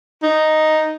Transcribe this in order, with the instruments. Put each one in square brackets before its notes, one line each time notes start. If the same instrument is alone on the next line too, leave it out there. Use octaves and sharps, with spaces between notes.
[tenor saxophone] D#4